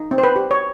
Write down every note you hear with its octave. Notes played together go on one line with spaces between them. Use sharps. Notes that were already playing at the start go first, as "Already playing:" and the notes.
Already playing: D#4
C4
C5
B4
G4
C#5